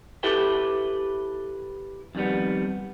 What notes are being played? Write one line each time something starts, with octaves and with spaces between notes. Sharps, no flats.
E4 G4 A4 B4 E5 G5
F2 D#3 G3 B3